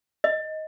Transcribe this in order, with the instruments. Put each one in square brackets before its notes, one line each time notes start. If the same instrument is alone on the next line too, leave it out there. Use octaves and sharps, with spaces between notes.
[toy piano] D#5